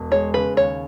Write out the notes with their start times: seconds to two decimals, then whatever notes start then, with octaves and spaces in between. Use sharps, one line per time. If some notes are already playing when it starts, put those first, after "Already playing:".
Already playing: E1
0.11 G#3 C#5
0.34 C#3 B4
0.57 D#2 C#5